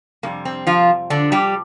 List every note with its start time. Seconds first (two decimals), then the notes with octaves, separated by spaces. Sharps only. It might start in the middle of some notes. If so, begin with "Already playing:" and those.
0.23 F2 C3 G3 A#3
0.45 C4
0.67 F3 F4
1.10 D3 D4
1.32 G3 G4